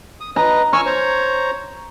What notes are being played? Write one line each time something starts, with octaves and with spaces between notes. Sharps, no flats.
D#6
B4 D#5 A#5
G#5 C#6 E6 F6
C5 C#5 A#5